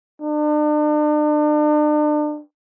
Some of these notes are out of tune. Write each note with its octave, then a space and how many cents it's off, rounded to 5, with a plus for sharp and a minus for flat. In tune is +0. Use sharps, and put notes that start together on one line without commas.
D4 +40